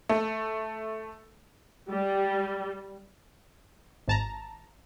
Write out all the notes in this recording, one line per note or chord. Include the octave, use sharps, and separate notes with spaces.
A3
G3
G#1 A5 A#5